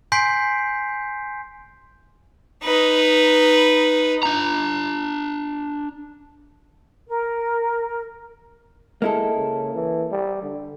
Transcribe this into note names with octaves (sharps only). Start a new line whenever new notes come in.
G#5 C6 G6 B6 C7 D7
D#4 B4
D4 A#5
A#4
G#3 A#3 E4 A4
C#3
E3
G3
D3